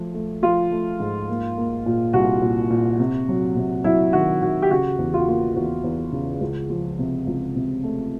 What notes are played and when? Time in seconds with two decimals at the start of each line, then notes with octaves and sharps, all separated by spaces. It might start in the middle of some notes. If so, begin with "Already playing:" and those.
Already playing: F3 A3
0.14 A3
0.42 F3 F4
0.72 A3
1.00 G#2
1.29 A#3
1.58 A#3
1.86 A#2
2.13 C2 F#4
2.42 A#2
2.70 A#2
3.00 C3
3.29 F#3
3.56 C3
3.84 F#3 E4
4.13 D#3 F#4
4.41 D#3 F#4
4.62 G4
4.71 C#3 F#4
4.98 E2
5.14 F4
5.20 F#4
5.27 A#3 F4
5.56 E2 F#4
5.84 E2
6.12 C#3
6.41 C#2
6.70 F3
6.99 C3
7.27 C#2
7.55 C3
7.83 A3